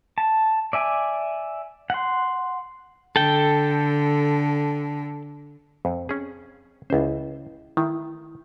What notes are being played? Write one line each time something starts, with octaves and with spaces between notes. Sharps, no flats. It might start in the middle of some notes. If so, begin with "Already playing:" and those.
A5
D5 E5 G#5
F#5 C6
D3 A4 G5
F2 C4
C#4 G#4
C#2 C#4 E4 C5
D#3 E4